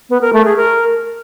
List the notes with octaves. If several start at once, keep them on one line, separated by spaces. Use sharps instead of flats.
B3
A#4
A3
G#4
A#4